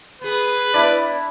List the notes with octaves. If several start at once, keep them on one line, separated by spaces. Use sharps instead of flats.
B3 G#4 B4
B3 D4 E4 D5 B5